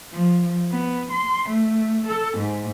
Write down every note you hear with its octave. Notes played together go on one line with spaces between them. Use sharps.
F3
B3
C6
A3
A4
G#2